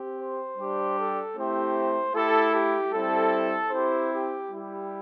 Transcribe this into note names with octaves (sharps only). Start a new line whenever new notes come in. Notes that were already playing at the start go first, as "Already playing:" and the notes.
Already playing: C4 G4
C5
G3 D4 G4
A4
A3 C4 E4 G4 C5
A3 E4 G4 A4
G4
G3 C4 E4 A4
C4 E4 G4 C5
G4
G3 E4 G4